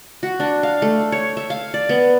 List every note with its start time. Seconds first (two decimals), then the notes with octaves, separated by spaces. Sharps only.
0.23 F#4
0.40 D4
0.63 F5
0.82 A3
1.12 C#5
1.37 E5
1.50 F5
1.74 D5
1.89 B3